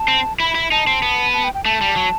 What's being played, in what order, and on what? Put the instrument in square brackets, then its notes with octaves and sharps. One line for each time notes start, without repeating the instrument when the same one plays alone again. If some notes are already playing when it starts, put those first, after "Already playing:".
Already playing: [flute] A5
[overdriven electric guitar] C4
[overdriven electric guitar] E4 [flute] B5
[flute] B5
[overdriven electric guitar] E4
[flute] B5
[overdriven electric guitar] D#4 [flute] A5
[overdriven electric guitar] C4
B3
[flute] A5
G5
G5
[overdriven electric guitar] A3 [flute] A5
[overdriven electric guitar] G3
F#3